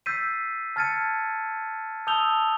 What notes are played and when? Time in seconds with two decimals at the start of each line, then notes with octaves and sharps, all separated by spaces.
0.06 E6 G6 A6 B6 C7 D#7
0.76 A5 F6 G#6 A6 C#7 D#7
2.07 A5 D#6 E6 G6 F7 G7